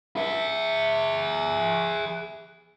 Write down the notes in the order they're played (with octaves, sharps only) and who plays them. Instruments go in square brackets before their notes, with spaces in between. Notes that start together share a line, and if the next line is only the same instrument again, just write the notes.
[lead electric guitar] G#4 E5